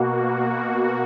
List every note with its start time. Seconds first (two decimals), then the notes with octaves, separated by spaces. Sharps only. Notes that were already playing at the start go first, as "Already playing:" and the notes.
Already playing: B2 A#3 F#4
0.22 F#4
0.51 F#4